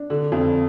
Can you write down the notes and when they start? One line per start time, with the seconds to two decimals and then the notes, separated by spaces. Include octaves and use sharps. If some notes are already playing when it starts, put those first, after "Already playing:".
Already playing: D4
0.10 D3
0.32 F2